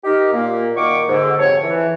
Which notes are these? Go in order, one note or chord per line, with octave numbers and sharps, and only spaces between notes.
D#4 G4 A#4
A#2 A#3
A#2 D#3 F#4 C#6 D6
G#2 D3
F2 C3 A4 C#5
E3